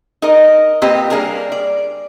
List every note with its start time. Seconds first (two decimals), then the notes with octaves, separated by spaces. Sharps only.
0.22 D#4 A#4 D#5
0.82 A#2 A#3 C4 G4 B4 D#5
1.10 G3 A#3 D4 G#4 A#4
1.52 D5